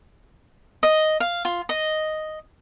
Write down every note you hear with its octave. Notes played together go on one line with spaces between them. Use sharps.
D#5
F5
F4
D#5